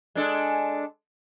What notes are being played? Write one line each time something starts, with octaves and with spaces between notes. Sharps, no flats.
G#3 D4 A4